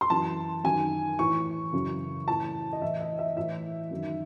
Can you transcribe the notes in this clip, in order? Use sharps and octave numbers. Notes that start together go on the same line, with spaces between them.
C6
F#2 E3 A5
F#2 D#3 G#5
A2 E3 C#6
F#2 C#3 E3
A2 E3 A5
D#5
A2 E3 E5
D#5
E5
A2 E3 E5
F#2 D#3